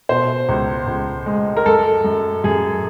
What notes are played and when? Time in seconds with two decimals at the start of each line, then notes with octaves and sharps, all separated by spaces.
0.09 B2 C5
0.49 C#2
0.87 C#2
1.26 G#3
1.57 A#4
1.66 F#2 A4
2.05 F#2
2.44 F#2 G#4